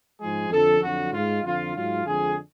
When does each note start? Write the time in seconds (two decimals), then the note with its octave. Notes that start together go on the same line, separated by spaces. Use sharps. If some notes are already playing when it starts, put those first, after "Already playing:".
0.19 G#2 F3 G#3 G#4
0.50 F2 D3 F3 A4
0.81 F2 D3 F#3 F#4
1.12 G#2 G#3 F4
1.43 F2 D3 F3 F4
1.74 G#2 F#3 F4
2.05 F2 D3 F3 G#3 G#4